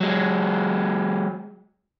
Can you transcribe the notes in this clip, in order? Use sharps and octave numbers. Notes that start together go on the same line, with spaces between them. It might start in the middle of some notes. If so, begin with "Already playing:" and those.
F#3 G#3